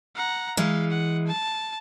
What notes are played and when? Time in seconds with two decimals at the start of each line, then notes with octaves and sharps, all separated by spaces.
0.15 F#5 A#5
0.57 E3 G#3 F5
0.91 F#5
1.27 A5